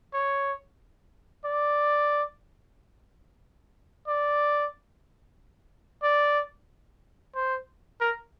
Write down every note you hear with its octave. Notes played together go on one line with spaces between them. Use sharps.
C#5
D5
D5
D5
C5
A#4